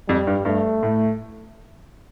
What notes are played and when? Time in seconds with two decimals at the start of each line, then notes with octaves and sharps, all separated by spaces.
0.08 F2 G3
0.27 G2
0.45 G2 A3
0.83 A2